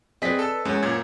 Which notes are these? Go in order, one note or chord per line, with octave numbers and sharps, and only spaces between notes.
C4 G#4 B4 D5 D#5 B6
A4 E6
E2 G#3 C#4 A#4
F#2 A#2 G#6